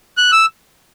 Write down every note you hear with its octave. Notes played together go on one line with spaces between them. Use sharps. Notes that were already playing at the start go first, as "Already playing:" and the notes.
F#6
E6